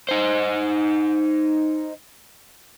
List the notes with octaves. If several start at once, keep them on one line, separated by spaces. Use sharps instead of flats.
D#4 C5